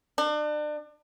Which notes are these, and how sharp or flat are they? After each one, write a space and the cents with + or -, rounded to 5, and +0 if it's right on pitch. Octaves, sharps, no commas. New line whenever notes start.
D4 +35